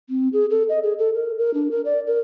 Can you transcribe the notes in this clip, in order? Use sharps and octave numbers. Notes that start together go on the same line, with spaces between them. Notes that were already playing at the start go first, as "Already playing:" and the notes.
C4
G#4
A4
D#5
G#4
A4
A#4
A#4
D4
A#4
D5
A#4